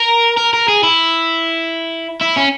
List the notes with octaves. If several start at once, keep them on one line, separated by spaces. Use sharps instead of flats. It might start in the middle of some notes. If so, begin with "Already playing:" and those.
Already playing: A#4
A#4
A#4
G#4
E4
E4
C#4